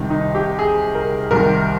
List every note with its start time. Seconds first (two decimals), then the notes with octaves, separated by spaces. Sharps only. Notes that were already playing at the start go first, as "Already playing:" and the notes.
Already playing: C2 C3 D#3
0.10 D#4
0.35 G4
0.59 G#4
0.95 A#4
1.31 C2 C3 D#3 A#4